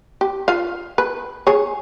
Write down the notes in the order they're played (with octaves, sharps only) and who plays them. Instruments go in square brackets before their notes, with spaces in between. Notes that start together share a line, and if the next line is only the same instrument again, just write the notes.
[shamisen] G4
F4 F5
B4
G#4 C#5